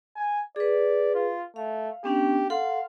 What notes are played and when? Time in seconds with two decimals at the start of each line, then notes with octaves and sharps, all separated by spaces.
0.16 G#5
0.56 G#4 B4 D5
1.14 F4
1.56 A3 F5
2.04 B3 C#4 D4 G4
2.50 A4 F5 F#5 C6